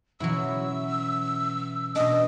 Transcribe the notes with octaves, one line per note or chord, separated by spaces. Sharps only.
B2 E3 F#3 C#4 E4 E6
B2 D4 D#5